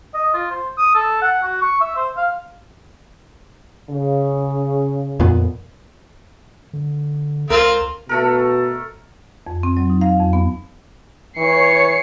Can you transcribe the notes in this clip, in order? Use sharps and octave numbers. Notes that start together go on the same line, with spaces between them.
D#5
F4
C5
D#6
A4
F#5
F#4
C#6
E5
C5
F5
C#3
F2 A#2 B3
D3
C#2 C4 F4 A#4
B2 A3 A4 A#4
F2
C4
F#3
D#4
F5
F2
B3
E3 C#5 C7 C#7